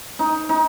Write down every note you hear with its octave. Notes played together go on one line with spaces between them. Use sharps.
D#4
D#4